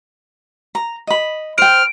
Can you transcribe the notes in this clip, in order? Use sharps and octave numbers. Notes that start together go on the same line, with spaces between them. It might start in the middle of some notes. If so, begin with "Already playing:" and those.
A#5
D#5 B5
C5 G5 F6 D7